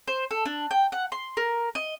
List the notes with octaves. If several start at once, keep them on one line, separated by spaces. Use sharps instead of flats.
C5
A4
D4
G5
F#5
C6
A#4
D#5